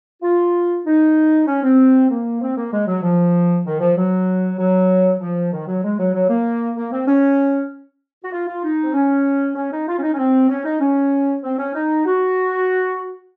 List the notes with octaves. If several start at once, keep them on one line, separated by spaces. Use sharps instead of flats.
F4
D#4
C#4
C4
A#3
C4
A#3
G#3
F#3
F3
D#3
F3
F#3
F#3
F3
D#3
F#3
G#3
F#3
F#3
A#3
A#3
C4
C#4
F#4
F4
F4
D#4
C4
C#4
C#4
D#4
F4
C#4
D#4
C#4
C4
C#4
D#4
C#4
C4
C#4
D#4
F#4